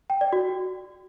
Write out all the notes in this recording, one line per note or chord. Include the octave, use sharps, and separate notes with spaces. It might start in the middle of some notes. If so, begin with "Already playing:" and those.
G5
D5
F#4